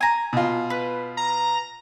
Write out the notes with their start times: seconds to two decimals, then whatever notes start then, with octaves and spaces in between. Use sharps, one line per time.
0.01 G#5 A#5
0.33 B2 F4
0.70 B4
1.17 A#5